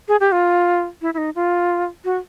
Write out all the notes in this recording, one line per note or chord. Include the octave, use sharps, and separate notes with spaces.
G#4
G4
F4
E4
E4
D#4
F4
F#4